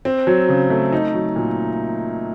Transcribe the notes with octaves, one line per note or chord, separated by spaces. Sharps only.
C4
F#3
C#3
A3
D#4
F#3
A#2